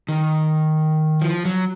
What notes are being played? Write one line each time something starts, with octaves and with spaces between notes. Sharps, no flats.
D#3
F3
F#3